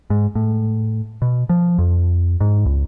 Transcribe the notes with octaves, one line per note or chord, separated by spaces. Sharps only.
G#2
A2
B2
F3
F2
G#2
C#2